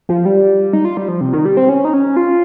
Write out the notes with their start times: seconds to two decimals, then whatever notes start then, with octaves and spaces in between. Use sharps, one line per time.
0.09 F3
0.25 G3
0.73 D#4
0.85 F4
0.97 G3
1.08 F3
1.21 C3
1.33 D#3
1.45 G3
1.57 C4
1.69 C#4
1.85 D#4
1.93 C#4
2.16 F4